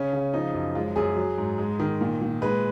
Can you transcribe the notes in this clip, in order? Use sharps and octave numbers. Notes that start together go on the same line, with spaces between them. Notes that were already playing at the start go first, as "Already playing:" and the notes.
Already playing: C#3 C#4
C#3
F3 D#4
F#2
G#3 F4
F#2 G#4
F#3
G#2
G#3
D#3
A#2
A#2
G#3 B4